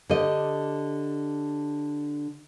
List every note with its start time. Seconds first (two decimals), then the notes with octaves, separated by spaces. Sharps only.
0.10 D3 G4 D#5